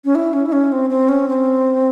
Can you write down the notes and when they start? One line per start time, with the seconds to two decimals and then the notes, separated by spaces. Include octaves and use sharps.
0.05 C#4
0.15 E4
0.33 C#4
0.46 E4
0.53 C#4
0.72 C4
0.90 C4
1.09 C#4
1.28 C4